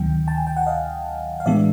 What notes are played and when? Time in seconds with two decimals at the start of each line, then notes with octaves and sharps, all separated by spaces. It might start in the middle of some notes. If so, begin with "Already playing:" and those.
Already playing: D2 C3 D#3 F#3 G5
0.27 G5 A5
0.37 G#5
0.47 G5
0.57 F#5
0.66 D#5 F5
1.40 F5
1.46 A2 E3 G#3 B3 D4 D5 E5